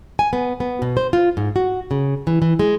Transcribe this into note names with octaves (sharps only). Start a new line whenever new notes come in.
G#5
B3
B3
B2
C5
F4
G#2
F#4
C#3
E3
E3
G#3